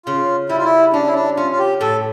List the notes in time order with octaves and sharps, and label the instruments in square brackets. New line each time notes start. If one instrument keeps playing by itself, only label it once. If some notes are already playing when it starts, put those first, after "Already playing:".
[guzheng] C#3 [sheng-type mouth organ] F4
[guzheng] G3 [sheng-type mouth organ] E4
[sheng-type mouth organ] F4
E4
[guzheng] C#4 [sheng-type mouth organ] D4
[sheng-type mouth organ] E4
D4
[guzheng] C#4 [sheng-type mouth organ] F4
[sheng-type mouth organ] F4
G4
[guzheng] A2 [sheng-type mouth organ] A4